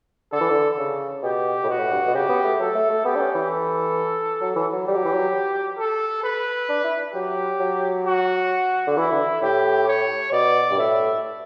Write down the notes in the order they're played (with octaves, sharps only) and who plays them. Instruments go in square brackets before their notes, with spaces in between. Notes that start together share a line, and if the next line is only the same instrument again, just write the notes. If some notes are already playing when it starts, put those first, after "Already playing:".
[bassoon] D3 [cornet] A4
[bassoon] E3
D3
C#3
[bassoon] B2 [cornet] G4
[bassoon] A2
[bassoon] B2 [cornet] F#4
[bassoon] A2
G2
B2
[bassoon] C#3 [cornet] G4
[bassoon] B3
A3
[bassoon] F#3 [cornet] A4
[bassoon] A3
A3
[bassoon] B3 [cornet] G4
[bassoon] D4
C#4
E3
[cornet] A4
[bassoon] F#3
E3
F#3
[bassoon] G3 [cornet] G4
[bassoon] F#3
E3
F#3
[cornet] A4
B4
[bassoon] D4
E4
[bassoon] F#3 [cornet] G4
[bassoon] F#3
[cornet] F#4
[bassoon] D3
[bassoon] E3 [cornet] E4
[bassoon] D3
[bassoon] A2 [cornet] G4
[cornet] C#5
[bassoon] B2 [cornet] D5
[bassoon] G2
[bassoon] A2 [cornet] E5